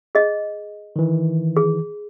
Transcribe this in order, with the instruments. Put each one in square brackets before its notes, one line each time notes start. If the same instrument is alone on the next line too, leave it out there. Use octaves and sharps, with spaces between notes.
[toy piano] G#4 D#5
[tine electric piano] D#3 E3
[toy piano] G#4